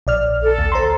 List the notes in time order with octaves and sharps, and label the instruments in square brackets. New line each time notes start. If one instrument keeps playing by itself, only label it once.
[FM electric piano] A#1 D5 F6
[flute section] A4
[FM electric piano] D2
C5 A#5 C6